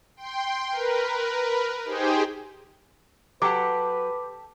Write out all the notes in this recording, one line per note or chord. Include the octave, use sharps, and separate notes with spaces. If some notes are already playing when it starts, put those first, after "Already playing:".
G5 C6
A#4 B4
D#4 G4 G#4 C5 G5 G#5
F#3 G4 A4 B4 F#5 D6